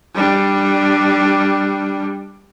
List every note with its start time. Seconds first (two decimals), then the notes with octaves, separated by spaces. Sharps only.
0.15 G3 D4